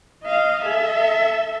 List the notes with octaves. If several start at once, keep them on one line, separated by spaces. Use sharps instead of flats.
D#5 F5
A4 E5